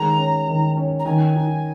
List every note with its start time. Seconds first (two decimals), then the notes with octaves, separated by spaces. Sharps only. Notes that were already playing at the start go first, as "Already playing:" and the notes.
Already playing: D#3 G#3 C#4 A#5
0.18 C#4
0.48 D#3
0.77 C#4
0.99 A#5
1.05 D#3 G#5
1.36 D#4